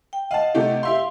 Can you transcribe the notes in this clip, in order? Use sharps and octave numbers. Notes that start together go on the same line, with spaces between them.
G5
D#5 F5 F#5 A5
C3 A3 G4
G4 E5 F5 C6